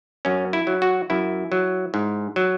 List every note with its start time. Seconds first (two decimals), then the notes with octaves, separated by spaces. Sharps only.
0.25 F#2 C#4
0.53 E4
0.67 F#3
0.82 F#4
1.10 F#2 E4
1.52 F#3
1.94 G#2
2.36 F#3